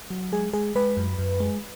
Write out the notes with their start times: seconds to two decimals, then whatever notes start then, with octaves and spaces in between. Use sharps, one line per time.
0.10 F#3
0.32 G#3 G#4
0.53 G#3 G#4
0.75 G#3 B4
0.97 F#2
1.19 F#2
1.40 G#3